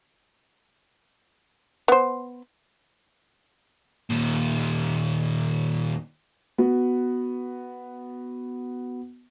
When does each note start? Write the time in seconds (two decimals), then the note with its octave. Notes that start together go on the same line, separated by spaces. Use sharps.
1.88 B3 C5
4.10 D#2 A#2
6.58 B3 F#4